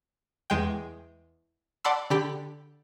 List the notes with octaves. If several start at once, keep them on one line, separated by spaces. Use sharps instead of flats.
E2 G#3 G5
D5 F#5 A5 B5 C6 E6
D3 G4 B5